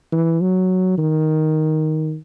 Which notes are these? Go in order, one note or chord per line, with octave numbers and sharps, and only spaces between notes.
E3
F#3
D#3